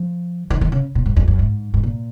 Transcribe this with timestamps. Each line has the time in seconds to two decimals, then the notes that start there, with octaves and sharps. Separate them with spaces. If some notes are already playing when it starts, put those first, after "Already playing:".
Already playing: F3
0.50 D#3
0.61 D#3
0.72 C#3
0.95 A#2
1.06 G#2
1.16 F2
1.28 F#2
1.39 G#2
1.74 G#2
1.83 A#2